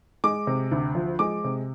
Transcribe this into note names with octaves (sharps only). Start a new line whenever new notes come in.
G#3 D6
C3
D2
F3
G#3 D6
C3